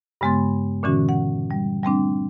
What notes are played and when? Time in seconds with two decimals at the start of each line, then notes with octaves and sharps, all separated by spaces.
0.21 G2 C#3 G#3 B3 C6 A6
0.83 A#2 D3 E3 C#4 F#4
1.09 F#5
1.51 G3
1.83 G3 A3 C4 D4